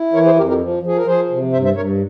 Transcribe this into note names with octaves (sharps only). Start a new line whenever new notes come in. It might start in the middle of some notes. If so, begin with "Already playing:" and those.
Already playing: E4
E3 A#4 C#5
G#4 C5
F2 G4 A#4
G4 A#4
F3
F3 G#4
A#4
F3 G#4 C5
C3
G2 C5 E5
C5 E5
G2 A#4 C#5